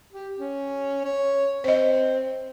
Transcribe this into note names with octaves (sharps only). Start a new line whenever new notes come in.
G4
C#4
C#5
C4 C5 D#5